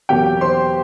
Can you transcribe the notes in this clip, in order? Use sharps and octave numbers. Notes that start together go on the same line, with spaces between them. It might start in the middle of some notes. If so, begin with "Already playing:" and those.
E2 B2 F#3 A#3 G4 G5
C5 C6